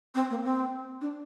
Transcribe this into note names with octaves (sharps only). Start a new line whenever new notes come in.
C4
A#3
C4
D4